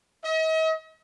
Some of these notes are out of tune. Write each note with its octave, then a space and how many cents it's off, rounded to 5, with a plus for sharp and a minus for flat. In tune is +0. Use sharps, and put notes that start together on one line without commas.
D#5 +45